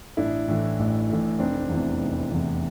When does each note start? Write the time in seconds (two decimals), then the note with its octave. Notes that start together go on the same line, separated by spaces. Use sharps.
0.17 A1 D4 E4
0.48 A2 E3
0.79 A1
1.09 A2 E3
1.39 F1 C4 D4
1.70 E2 C3 E3
2.00 F1
2.31 E2 C3 E3